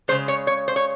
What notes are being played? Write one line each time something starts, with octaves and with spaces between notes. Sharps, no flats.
C#3 E3 G#3 C5
C#5
C#5
C5
C#5